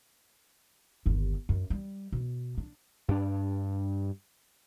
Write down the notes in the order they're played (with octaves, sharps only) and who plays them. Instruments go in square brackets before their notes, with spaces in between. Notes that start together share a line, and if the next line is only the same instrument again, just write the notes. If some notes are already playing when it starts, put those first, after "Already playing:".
[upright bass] G1 D#2
F#2
G3
B2
D4
[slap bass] G2 D4